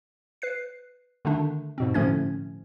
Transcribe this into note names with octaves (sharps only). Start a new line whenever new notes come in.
B4 F#6 C7
D3 D#3 A3 D4
G#2 B2 C4
A2 D3 F3 A3 C#4 G#6